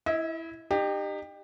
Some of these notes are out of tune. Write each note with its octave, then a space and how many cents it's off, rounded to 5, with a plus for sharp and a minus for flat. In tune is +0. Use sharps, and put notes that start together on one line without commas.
E4 +0 D#5 +45
D#4 -35 G4 +15